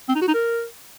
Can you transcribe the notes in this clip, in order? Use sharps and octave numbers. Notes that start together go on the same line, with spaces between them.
C4
D#4
F#4
D#4
A#4